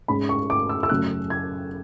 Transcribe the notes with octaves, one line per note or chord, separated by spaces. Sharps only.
G#2 G#3 C#4 B5
C#6
D6
E6
E6
F#2 C#3 F#3 A3 C#4 F#6
G#6